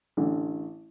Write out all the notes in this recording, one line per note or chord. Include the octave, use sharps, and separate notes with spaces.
A1 D3